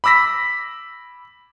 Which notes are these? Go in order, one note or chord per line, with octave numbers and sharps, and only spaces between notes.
B5 D6 E6 A#6 B6